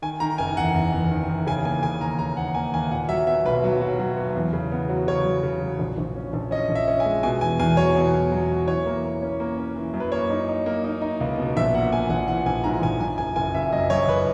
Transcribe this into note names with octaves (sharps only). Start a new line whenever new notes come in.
D#3 G#5
D#3 A#5
F#1 G#5
E2 F#5
E2
E2
D#3
E2
C#3 G#5
A#3 G#5
C#3 G#5
D#2 A#5
C#3 A#5
D#2 F#5
A#3 G#5
D#2 G#5
A#2 F#5
F#3 E5
B3 E5
B1 B4
F#3
F#3
F#3
B3
E2
C#3
B3
F#3
C#3 C#5
F#3
C#3
F#3
A#1
A#1
C#4
A#1
C#4 D#5
A#1
E5
C#4
G#5
G#3
B2 G#5
E2 G#5
E2 G#5
F#3 C#5
B2
E2
F#3
F#3
E3 C#5
A#3
A#3
C#4
A#3
C#4
E3
F#2
B4
A#3 C#5
D#4
D#4
A#3
D#4
D#4
C#2
B2
A#1 E5
A#3 F#5
A#3 G#5
A#1 F#5
E3 F#5
A#1 G#5
G#2 A#5
A#1 G#5
F#2 G#5
F#1 G#5
F#1 G#5
F#1 E5
F#2 D#5
F#2 C#5
F#1 B4